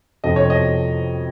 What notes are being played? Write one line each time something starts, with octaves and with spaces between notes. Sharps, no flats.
F2 C3 F3 D#5
C#5
D#5